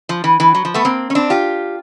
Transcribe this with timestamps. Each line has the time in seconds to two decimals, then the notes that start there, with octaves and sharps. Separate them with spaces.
0.09 F3
0.24 E3
0.40 E3
0.55 F#3
0.65 F3
0.74 A3 B3
0.85 A#3 C4
1.10 C#4
1.15 C4 D4
1.30 F4 G4